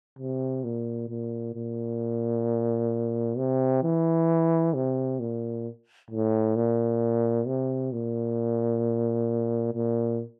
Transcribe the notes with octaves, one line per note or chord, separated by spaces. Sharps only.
C3
A#2
A#2
A#2
C3
E3
C3
A#2
A2
A#2
C3
A#2
A#2